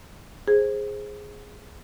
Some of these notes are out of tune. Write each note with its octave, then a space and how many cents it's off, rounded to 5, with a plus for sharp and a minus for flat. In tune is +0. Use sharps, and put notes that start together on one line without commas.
G#4 +0 C5 +15